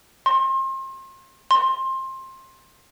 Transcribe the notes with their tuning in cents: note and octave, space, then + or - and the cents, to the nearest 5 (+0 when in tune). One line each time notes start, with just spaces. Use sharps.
C6 +35
C6 +20